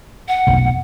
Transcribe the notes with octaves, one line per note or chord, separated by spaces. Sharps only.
F#5
F1 B1